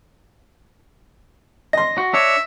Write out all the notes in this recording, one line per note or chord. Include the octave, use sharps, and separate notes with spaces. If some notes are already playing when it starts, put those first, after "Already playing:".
D#5 C6 A#6
F#4
D4 C#5 E5